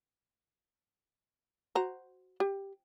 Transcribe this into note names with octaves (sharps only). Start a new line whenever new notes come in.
F#4 C5 A#5
G4